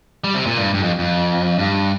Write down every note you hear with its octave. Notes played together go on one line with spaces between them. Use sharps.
G3
C3
A#2
G2
G2
F2
F2
G2